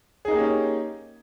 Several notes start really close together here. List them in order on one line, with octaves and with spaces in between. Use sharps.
G#4 D#4 A#3 G4 C#4